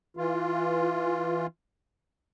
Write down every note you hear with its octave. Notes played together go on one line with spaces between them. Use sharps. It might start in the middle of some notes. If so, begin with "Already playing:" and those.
E3 F4